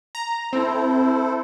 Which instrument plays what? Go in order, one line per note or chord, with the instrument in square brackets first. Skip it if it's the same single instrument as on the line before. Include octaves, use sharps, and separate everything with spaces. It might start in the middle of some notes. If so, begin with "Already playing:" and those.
[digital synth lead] A#5
[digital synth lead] C4 [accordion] E4 A4 C5